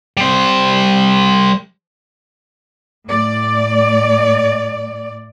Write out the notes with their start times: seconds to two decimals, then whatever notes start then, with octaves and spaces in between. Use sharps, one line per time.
0.17 G3 C5
3.06 A2 D5